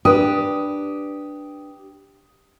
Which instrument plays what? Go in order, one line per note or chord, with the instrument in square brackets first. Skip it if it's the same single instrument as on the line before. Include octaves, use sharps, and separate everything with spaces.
[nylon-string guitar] D4 B4 [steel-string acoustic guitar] G4 [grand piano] D#6